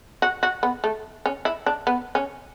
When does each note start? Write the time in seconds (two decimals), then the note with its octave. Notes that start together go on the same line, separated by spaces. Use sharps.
0.22 F#4
0.43 F#4
0.63 B3
0.84 A3
1.26 C#4
1.45 E4
1.66 D4
1.87 B3
2.15 C#4